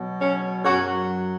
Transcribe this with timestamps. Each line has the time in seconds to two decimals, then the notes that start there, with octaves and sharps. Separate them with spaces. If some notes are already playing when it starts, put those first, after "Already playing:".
Already playing: B2 F#3
0.20 C#4
0.64 F#2 F#3 C#4 F#4